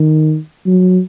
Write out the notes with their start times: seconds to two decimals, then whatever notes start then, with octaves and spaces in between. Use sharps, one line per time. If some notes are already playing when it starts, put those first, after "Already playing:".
Already playing: D#3
0.66 F#3